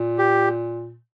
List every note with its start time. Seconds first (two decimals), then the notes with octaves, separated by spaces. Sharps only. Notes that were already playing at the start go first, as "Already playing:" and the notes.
Already playing: A#2
0.18 G4